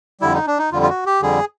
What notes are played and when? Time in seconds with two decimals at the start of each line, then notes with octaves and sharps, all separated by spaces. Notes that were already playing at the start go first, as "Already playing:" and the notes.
0.21 F2 D3 G3 E4
0.34 D#4
0.47 D4
0.59 D#4
0.72 F2 D3 G3 F4
0.82 F4
0.89 F#4
1.06 G4
1.22 F2 D3 G3 G#4